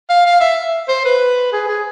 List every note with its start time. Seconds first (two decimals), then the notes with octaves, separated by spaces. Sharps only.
0.09 F5
0.26 F5
0.41 E5
0.88 C5
1.05 B4
1.53 G#4
1.68 G#4